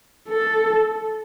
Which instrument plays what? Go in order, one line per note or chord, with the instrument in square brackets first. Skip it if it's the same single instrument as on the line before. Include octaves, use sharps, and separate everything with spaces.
[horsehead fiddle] A4